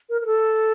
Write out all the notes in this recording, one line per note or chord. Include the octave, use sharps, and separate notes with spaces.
A#4
A#4
A4